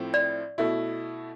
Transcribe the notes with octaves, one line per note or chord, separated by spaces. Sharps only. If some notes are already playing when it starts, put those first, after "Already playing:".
Already playing: A2 F3 C4 E4
D5
B2 A3 E4